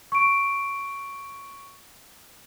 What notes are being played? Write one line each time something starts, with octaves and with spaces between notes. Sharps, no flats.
C#6 D7